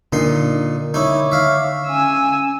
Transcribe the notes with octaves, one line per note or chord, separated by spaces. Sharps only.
A#2 D3 D#4 C6
D#4 E4 C#5 C#6 D6
E5 F5
C#4 G#5 E6